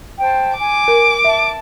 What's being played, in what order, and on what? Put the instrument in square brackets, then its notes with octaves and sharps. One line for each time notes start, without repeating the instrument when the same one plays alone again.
[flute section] C5 G5 A5
[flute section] G#5 [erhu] D6
[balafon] A#4
[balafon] E5 [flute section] A5